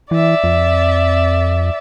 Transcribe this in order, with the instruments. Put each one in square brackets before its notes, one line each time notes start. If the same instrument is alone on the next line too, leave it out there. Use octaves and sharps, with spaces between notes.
[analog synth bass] E3 [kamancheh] D5 E5
[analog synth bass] F2